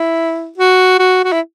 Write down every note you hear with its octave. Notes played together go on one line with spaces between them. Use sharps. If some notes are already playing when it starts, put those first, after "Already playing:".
Already playing: E4
F#4
F#4
F#4
E4